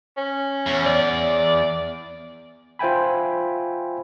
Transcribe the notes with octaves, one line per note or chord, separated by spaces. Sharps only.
C#4
E2
D5
F4 C5 E5 G5 G#5 B5